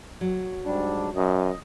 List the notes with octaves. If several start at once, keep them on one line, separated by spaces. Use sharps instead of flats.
F#3
G#2 G3 D4
F#2 D#5